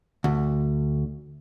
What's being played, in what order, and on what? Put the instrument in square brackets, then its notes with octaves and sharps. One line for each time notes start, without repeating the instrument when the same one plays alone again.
[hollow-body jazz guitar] D2